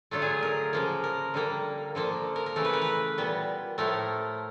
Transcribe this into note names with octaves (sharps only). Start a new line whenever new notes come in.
D3 F#3 A3 F4
G#4
A#4
C#3 F3 A#3
A#4
D3 G3 A#3
D3 F3 A#3
A#4
A#4
C#3 E3 A3
B4
A#4
B4
A#2 G3 B3
A2 F3 A3 A#4